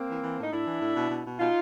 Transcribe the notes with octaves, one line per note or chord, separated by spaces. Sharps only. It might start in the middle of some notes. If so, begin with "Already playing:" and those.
Already playing: A#3 C4
E3
E3
A2 D#4
A2 D4 E4
E3
A2
B2
B2
B2
B2 D#4 F4